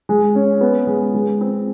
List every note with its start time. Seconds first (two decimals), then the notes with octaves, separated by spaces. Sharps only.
0.09 G#3
0.35 C#4
0.61 B3
0.87 G#3
1.14 G#3
1.41 C4